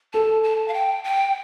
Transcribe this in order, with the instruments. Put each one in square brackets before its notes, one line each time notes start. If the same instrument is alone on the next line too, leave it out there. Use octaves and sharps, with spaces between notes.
[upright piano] A4 [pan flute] A5
[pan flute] A5
F5
G5
G5